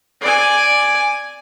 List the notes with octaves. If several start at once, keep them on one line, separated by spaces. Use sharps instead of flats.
D5 G#5